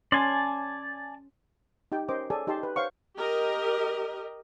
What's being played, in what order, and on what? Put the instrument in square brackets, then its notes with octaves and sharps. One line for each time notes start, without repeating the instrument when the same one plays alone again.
[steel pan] C#4 C6 [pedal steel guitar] D5 G#5 A5
[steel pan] D#4 G4 G5
C#4 A#4 C5 D#5 D6
G#4 A4 C#5 D5 G#5
D#4 G4 D#5 A5 C6
B4
C5 C#5 F5 F#5 C#6
[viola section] G4 A#4 D#5